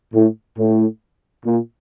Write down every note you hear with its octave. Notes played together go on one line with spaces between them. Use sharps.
A2
A2
A#2